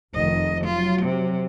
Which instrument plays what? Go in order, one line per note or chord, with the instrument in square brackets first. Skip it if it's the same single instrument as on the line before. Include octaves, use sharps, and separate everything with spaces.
[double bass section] F1 D#3 [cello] D#5
[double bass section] F#3 [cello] F4
[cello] C3